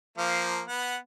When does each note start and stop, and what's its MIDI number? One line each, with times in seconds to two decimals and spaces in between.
0.18 0.62 53
0.18 0.62 58
0.68 0.97 59
0.68 0.97 78